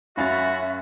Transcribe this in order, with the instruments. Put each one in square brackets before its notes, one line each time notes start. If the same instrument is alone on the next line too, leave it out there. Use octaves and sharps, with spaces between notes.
[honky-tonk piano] F#2 C#4 A6 [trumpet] F#4 [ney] E5 [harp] F5 B5